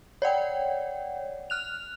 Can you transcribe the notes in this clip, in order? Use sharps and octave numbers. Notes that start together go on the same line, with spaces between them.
C#5 D5 F#5 G5
F6 F#6 F7